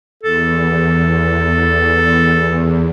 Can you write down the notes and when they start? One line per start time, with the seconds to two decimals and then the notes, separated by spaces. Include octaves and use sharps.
0.23 E2 A4